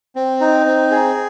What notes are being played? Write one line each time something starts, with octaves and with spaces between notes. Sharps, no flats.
C4
D#4
C4
G#4